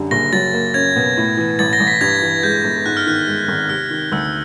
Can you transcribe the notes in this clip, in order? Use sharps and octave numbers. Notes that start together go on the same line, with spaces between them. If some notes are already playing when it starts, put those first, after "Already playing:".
Already playing: F#2 D3 G3
F#1 A#6
F#3 A6
A#3
C#4 G#6
B2
A2
E3
A1 A6
A#6
A1
B6
G2 G#6
E3
G#3 G6
G1
G#2 F#6
F6
D#3 F#6
G#3
G#1
C3 F6
D#3
D2 E6